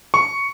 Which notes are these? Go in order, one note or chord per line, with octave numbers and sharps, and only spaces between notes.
C#6